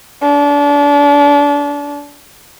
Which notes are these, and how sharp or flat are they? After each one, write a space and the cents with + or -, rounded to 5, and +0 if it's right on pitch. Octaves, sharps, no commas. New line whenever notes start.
D4 -30